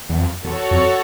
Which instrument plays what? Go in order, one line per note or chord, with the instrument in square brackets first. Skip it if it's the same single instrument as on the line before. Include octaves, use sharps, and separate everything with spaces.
[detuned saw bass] E2
F2
[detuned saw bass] E2 [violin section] F#4 A4 C#5
[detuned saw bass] F2